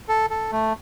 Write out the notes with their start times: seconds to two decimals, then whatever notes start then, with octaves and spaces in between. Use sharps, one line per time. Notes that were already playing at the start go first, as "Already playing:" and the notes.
0.09 A4
0.30 A4
0.52 A3